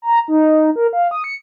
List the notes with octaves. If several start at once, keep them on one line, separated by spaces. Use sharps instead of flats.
A#5
D#4
A#4
F5
D#6
C#7